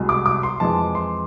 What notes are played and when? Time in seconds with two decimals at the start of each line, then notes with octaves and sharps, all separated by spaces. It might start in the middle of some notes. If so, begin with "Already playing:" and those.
Already playing: C2 B2 G#3
0.09 D6
0.26 D6
0.43 C6
0.60 F2 E3 G#3 A5
0.95 C6